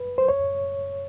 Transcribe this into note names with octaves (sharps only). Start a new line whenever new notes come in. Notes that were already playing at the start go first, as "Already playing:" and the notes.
Already playing: B4
C5
C#5